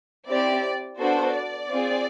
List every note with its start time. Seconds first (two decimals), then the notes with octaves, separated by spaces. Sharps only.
0.29 C4 E4 G4 D5
0.99 B3 D4 F#4 A4 C5
1.35 D5
1.71 C4 F4 G#4